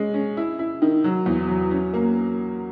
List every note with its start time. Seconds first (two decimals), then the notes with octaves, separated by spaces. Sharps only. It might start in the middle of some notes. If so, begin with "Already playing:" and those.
Already playing: G#3 C#4
0.14 C#4
0.37 E4
0.59 E4
0.82 D#3
1.04 F#3
1.26 E2
1.48 F#3
1.71 C#4
1.94 A#3